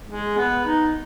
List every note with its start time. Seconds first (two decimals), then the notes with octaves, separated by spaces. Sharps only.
0.09 G#3
0.37 B3
0.65 D#4